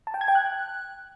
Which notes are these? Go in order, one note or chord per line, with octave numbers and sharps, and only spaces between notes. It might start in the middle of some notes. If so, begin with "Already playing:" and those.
A5
G5
G#6
G5
F#6